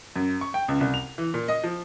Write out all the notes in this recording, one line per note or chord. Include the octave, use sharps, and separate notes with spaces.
F#2
C#6
G5
C#2
C2
F7
E3
A#2
D#5
F3